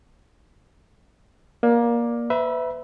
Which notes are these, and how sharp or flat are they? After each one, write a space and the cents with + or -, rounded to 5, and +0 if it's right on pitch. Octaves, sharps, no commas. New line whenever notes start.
A#3 +20 D5 +0
B4 +35 E5 +0 B5 -35